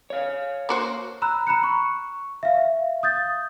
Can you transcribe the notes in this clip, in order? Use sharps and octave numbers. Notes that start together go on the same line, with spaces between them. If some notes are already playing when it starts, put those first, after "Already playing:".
C#5 F5
A#3 F#4 C5
A#5 B5 E6 F#6
A#5 B5 F#6 C#7
C#6
E5 F5
D#6 G6 A6